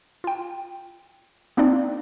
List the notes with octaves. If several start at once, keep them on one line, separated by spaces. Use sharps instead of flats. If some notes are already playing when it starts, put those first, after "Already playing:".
F4 G5
A#3 C4 D4 D#4 D5